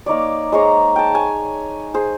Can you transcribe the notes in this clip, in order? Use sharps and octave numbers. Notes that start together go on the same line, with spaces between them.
A#3 D#4 C#5 D5
G#3 C5 C#5 A#5
G5 A5
C#5 G#5
G#4 C5